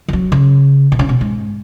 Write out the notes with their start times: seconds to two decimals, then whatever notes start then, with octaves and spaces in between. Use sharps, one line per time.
0.08 E3
0.13 F#3
0.32 C#3
0.92 B2
0.99 C#3
1.09 B2
1.21 G#2